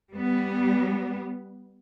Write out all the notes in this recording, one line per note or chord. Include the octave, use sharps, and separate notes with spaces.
G3 B3